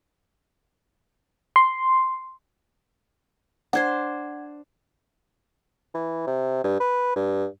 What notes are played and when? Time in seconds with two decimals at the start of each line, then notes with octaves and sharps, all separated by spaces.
1.56 C6
3.73 D4 C5 F#5 C6 G#6
5.94 E3
6.27 C3
6.64 G2
6.80 B4
7.16 G2